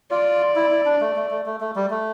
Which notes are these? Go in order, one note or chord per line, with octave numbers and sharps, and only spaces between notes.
F4 D5
E4
E4
D4
A3
A3
A3
A3
A3
G3
A3